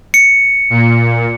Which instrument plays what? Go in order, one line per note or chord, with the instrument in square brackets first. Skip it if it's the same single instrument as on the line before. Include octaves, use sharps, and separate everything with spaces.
[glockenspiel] C#7
[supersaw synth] A#2